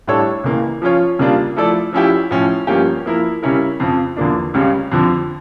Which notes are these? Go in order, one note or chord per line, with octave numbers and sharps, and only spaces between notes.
A2 G3 D4 A4 C#5
C#2 C#3 E3 A#3
F3 C#4 F4 C#5
C#3 G3 A#3 D4 F4
F3 A3 E4 A4 D5
F3 C#4 E4 G4
A2 F3 C#4
G2 F3 A#3 C#4 G4
F3 A#3 E4 A#4
C#3 G3 C#4 E4 A#4
F2 C#3 F3
E2 D3 F3 A#3 D4
C#2 C#3 G3 C#4
F2 D3 F3